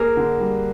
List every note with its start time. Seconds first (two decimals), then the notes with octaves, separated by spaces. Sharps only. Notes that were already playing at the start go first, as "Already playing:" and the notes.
Already playing: A#3 G#4 A#4
0.17 D3
0.40 G3